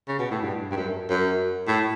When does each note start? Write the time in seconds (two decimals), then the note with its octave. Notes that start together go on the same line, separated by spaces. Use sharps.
0.08 C#3
0.19 B2
0.31 A2
0.42 G2
0.71 G2
0.77 F#2
1.10 F#2
1.68 A2